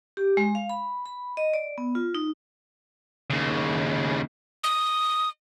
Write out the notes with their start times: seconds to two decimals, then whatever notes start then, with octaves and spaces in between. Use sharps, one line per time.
0.17 G4
0.37 G#3
0.55 F5
0.70 B5
1.06 B5
1.37 D#5
1.54 D5
1.78 B3
1.95 F4
2.15 D#4
3.30 D#2 C#3
4.64 D#6